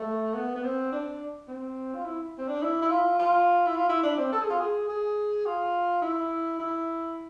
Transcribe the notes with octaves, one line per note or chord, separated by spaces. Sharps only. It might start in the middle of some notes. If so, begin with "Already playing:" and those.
Already playing: A3
B3
B3
C4
D4
C4
F4
E4
C4
D4
E4
E4
F4
F4
E4
F4
E4
D4
C4
A4
G#4
F4
G#4
G#4
F4
E4
E4